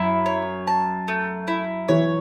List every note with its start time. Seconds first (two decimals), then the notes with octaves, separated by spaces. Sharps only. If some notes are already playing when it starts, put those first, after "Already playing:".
Already playing: F#2 E4
0.26 C#5
0.67 A5
1.08 A3
1.48 E4
1.88 E3 C#5